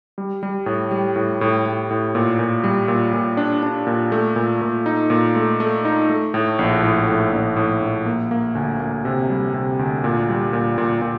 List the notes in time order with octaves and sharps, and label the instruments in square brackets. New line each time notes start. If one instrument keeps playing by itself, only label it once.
[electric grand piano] G3
G3
A2
G3
A2
A2
A2
A2
A#2
A#2
G3
A#2
A#2
D4
D4
A#2
A3
A#2
A#2
D#4
A#2
A3
A3
D#4
A3
A2
A#1
A2
A2
A#1
A2
A#1
A#3
A#3
D2
A#3
C3
G3
C3
D2
A#2
G3
A#2
A#2
A#2